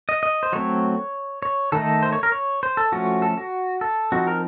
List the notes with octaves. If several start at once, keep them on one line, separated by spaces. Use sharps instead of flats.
D#5
D#5
C5
F#3 A3 C4 C#5
C#5
D#3 A3 D#4 A4
C5
C#5
A#4
C#5
C5
A4
F3 A3 C#4 F#4
A4
F#4
A4
F3 C4 D#4 F#4
A#4